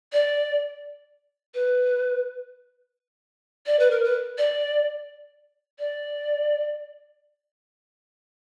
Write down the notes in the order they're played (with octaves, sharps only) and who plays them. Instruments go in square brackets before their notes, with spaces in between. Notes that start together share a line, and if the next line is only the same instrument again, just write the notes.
[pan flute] D5
B4
D5
B4
A#4
B4
D5
D5